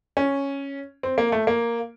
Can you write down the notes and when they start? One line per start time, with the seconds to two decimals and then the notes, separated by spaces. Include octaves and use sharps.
0.17 C#4
1.03 C4
1.18 A#3
1.32 A3
1.47 A#3